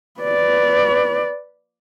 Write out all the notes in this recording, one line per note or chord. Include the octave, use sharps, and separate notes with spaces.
B4 D5